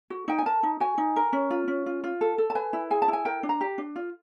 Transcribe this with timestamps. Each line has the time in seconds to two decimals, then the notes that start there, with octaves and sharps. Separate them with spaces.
0.10 F#4
0.28 D#4 G5
0.38 G#5
0.46 A#4 A5
0.63 D#4
0.80 F#4 G#5
0.98 D#4
1.16 A#4
1.33 C#4
1.50 F4
1.68 C#4
1.86 F4
2.04 F4
2.21 A4
2.38 A4
2.50 A5
2.55 B4 G#5
2.73 E4
2.90 G#4 G#5
3.02 A5
3.08 E4
3.13 G#5
3.25 A#4 G5
3.43 D4
3.49 A#5
3.61 G4
3.78 D4
3.96 F4